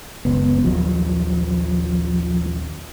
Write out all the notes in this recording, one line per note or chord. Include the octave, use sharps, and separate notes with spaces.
F#1 C#2 B3
A#1 D#2 F3 F#3